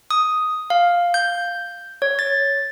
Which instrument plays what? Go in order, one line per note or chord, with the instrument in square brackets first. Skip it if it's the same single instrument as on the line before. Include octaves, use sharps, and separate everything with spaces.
[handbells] D#6
F5
G6
C#5
A6